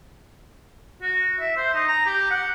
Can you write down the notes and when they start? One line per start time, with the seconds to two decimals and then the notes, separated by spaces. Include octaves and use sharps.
1.02 F#4
1.40 E5
1.57 C5
1.74 D#4
1.88 A#5
2.06 G4
2.31 F#5